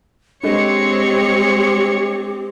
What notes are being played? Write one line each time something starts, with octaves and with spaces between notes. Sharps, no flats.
G#3 C4 D4 G4 A4 C#5 D#5 C#7